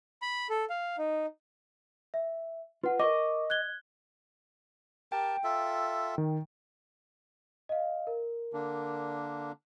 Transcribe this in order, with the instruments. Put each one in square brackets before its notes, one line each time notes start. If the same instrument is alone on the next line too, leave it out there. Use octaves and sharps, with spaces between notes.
[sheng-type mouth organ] B5
A4
F5
D#4
[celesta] E5
[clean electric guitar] F4 [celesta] B4 F#5
[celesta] A#4 C#6 D6 [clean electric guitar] D#5
[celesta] F#6 G#6 G7
[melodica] G4 A#4 A5 [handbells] G5
[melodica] F4 A4 E5
[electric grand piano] D#3
[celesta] D#5 F5
A#4
[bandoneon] D3 A#3 D4